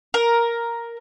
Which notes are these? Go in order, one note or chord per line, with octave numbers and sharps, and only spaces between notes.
A#4